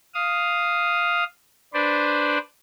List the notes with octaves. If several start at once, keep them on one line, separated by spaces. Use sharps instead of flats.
F5 D#6
D4 B4 C5 D5